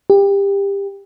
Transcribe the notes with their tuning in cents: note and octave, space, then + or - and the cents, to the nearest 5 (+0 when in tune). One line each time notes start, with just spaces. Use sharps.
G4 +25